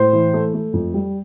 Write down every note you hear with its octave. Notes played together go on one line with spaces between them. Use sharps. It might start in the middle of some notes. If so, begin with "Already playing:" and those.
Already playing: A2 C5
E3
A3
A3
F2
G3